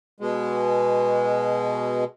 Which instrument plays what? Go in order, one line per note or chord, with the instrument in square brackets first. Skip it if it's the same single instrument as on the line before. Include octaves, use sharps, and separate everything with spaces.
[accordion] B2 G#3